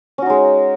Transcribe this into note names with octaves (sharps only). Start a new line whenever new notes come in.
G#3 C#4 D#4 F#4